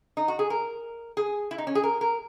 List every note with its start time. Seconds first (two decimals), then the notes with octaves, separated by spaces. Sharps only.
0.17 D#4
0.28 F#4
0.39 G#4
0.50 A#4
1.17 G#4
1.51 E4
1.58 D#4
1.67 C#4
1.75 G#4
1.83 A#4
2.01 A#4